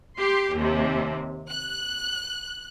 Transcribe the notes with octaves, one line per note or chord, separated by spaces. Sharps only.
G4 C6
D#2 C3
F#6